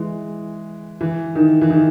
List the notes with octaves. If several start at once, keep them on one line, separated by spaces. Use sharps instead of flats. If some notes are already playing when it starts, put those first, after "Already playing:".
Already playing: E3 G#3
E3
D#3
E3
D#3